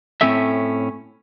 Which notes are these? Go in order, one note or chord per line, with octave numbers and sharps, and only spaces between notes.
A2 C4 C#4 A4 E5